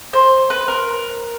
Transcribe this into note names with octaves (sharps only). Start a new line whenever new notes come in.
C5
B4
A#4